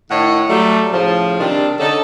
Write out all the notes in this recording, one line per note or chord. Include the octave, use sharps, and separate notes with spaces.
A2 D#3 C#5 D#5 F#5
F#3 G3 A3
A2 C#3 F3
C3 D#3 G3 D4
D3 C#4 D#4 A4